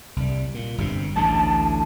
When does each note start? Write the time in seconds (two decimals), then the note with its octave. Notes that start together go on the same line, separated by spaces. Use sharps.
0.16 C2 G3
0.54 A#2
0.78 G1 G2 C3
1.16 A1 D2 D3 A5